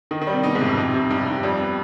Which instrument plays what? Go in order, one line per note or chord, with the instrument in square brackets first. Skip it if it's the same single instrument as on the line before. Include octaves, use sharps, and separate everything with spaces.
[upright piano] D#3 [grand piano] D#4
[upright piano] D#3
[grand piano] G3
[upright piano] C3
[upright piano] B2 [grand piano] D#4
[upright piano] G#2
[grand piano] C3
[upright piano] F2
[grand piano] D#4
C3
[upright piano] G2 [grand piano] D#4
[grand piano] D#4
[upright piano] F2 [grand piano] G3
[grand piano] B3